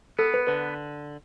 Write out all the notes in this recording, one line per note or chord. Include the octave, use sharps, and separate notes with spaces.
B3 A4
B4
D3 B4